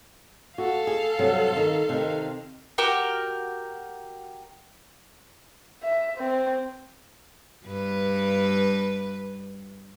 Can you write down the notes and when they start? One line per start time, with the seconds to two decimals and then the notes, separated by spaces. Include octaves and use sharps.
0.58 F#4 A4 F5
0.87 G#4
1.19 G2 C3 F#3
1.57 D#3
1.89 C3 D#3
2.78 F#4 G4 A#4 G5
5.83 E5
6.18 C4
7.66 G2 B4